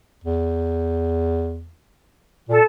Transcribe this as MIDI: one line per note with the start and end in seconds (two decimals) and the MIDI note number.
0.24 1.72 40
2.49 2.60 46
2.49 2.63 69